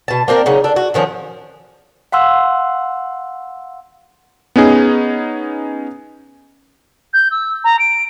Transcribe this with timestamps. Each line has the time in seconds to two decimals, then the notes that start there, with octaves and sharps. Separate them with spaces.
0.08 B2 A5
0.28 A#3 C4 D4 A#4
0.46 C#3 F#3 D#4
0.64 D4 A4
0.76 F#4
0.94 D3 D#3 F3 C#4
2.12 F5 F#5 C6 E6
4.56 B3 C#4 D#4 G#4
7.13 G6
7.31 E6
7.64 A#5
7.79 D7